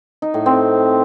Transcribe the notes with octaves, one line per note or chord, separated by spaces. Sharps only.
D#4
A2
C4